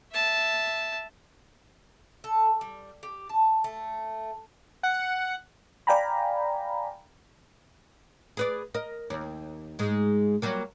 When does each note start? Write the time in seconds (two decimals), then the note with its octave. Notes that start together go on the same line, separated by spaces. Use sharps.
0.12 E5 A5
2.24 A4
2.61 G3
3.03 G4
3.29 A5
3.64 A3
4.83 F#5
5.87 D5 F5 G5 G#5 A#5 B5
8.37 G#4 B4 D5
8.74 A#4 D#5
9.10 D#2
9.79 G#2 G#3
10.42 F#3 G3 A#3